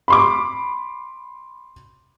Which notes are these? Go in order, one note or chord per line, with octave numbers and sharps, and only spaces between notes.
B5 C6 D6